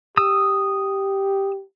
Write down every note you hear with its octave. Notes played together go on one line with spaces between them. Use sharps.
G4 D#6 E6